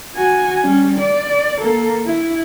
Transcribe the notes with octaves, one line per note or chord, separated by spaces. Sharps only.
F#4 G#5
G3 C#4
D5
A#3 A4
E4